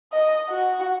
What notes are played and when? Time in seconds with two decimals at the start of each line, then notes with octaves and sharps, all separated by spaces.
0.13 D#5
0.49 F#4